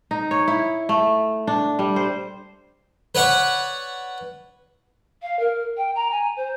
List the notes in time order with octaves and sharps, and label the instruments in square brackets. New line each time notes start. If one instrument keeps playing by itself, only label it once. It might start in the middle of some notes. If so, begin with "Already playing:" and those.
[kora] D#4
C#5
E4
A3
D4
G3
C5
[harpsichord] B4 C#5 D5 F#5 B5 C#6
[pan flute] F5
A#4
G5
A#5
G#5
C5